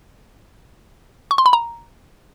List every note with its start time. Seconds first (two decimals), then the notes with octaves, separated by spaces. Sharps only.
1.31 C#6
1.38 C6
1.46 B5
1.53 A#5